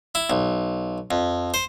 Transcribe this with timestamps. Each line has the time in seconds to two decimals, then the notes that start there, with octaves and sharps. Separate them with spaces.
0.15 E4
0.30 B1
1.11 F2
1.54 C5